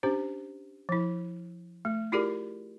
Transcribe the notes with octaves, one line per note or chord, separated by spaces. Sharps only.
C#4 D4 G4 C5
F3 E4
A3
E4 F4 G4 G#4 A#4 D5